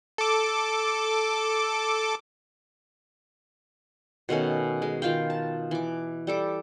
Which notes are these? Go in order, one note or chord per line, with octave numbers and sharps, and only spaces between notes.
A4 D6
B2 D#3 A3 C#4
G#3
D#3 F4 F5 G5
A5
E3 D6
G3 A4 D6